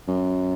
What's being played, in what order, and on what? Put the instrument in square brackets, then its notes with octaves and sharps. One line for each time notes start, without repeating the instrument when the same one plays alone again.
[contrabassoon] F#2